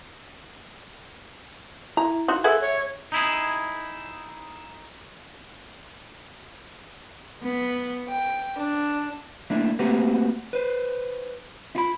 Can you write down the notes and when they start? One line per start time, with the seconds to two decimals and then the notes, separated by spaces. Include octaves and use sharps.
1.97 E4 A#5
2.28 D#4 F4 F#4
2.44 G#4 A4 B4 E5 F#5 G#6
2.61 C#5
3.12 D#4 E4 G#4
7.43 B3
8.08 G5
8.57 D4
9.50 A3 A#3 D4 E4
9.79 A3 A#3 C4 F#4 G4 B4
10.53 B4 C5
11.75 E4 F4 B5